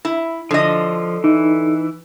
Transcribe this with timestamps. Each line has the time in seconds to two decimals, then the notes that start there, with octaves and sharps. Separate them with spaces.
0.05 E4
0.51 D3 F3 D#5
1.24 E3 D#4